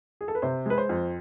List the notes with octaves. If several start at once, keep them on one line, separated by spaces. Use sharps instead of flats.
G#4
A4
B4
C3 C5
G#3 B4
C5
F2